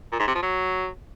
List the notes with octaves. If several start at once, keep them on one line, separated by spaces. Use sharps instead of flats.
A#2
G#2
C3
F3
F#3